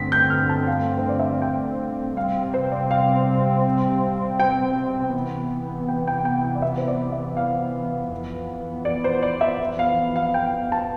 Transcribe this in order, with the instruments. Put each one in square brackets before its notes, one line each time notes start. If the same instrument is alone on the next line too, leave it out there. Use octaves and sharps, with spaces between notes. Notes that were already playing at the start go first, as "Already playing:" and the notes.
Already playing: [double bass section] G2 D3 A3 C4 [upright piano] B6
[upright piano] G6
F6
A5
F5
C5
D5
E5
F5
G5
[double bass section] C3 G3 C4 [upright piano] F5
[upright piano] C5
D5
F5
G5
[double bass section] C3 E3 B3
[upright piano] G5
G5
G5
G5
D5
E5
C5
D5
E5
F5
[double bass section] F2 E3 B3
[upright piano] D5
C5
D5
E5
F5
F5
G5
A5